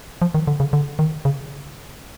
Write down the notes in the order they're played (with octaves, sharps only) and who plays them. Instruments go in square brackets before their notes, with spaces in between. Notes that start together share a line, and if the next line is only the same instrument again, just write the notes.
[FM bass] F3
D#3
D3
C#3
D3
D#3
C#3